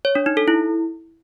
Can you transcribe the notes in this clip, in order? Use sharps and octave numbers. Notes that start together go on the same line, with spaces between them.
C#5
D4
D#4
A4
E4